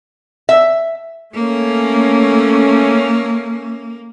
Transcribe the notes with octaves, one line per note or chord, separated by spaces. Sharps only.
E5
A3 A#3 C#4